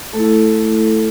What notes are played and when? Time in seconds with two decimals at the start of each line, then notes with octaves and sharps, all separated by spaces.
0.13 A3 A4
0.19 E4